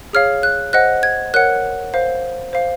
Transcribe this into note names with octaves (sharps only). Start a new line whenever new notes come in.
G#4 C#5 F5 F6
F#6
C5 D#5 F#5 F#6
G#6
A#4 C#5 F#5 F#6
C5 F5
C5 F5